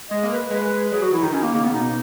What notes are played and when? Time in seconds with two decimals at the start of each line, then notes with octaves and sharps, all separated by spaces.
0.10 G#3 D#5
0.23 A#3
0.31 B4
0.51 G#3 B4
0.92 F#3 G#4
1.02 F#3 F#4
1.12 E3 E4
1.23 D#3 D#4
1.33 D#3 C#4
1.43 A#3
1.53 C#3 A#3
1.64 B3
1.74 B2 D#4